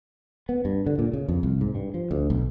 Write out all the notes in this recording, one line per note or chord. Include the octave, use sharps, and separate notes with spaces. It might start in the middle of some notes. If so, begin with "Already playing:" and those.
B3
G2
D3
A#2
C#3
F2
C2
G#2
G2
F3
D2
B1